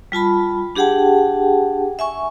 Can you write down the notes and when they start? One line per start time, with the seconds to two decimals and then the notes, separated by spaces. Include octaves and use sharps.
0.12 G3 F4 A5 B5
0.76 D4 G4 G#4 F#5 G5 A5
1.99 E5 G#5 C#6